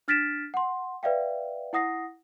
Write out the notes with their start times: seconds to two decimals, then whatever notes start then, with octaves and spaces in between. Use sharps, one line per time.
0.08 D4 F6 A6 B6 D7 E7
0.54 F#5 C6
1.03 B4 D5 E5 F5 G5
1.73 E4 F#5 D#6 A#6 C7